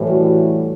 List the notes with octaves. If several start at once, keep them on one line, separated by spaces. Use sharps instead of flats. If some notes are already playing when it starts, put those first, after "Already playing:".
Already playing: A2 E3 G3
F#4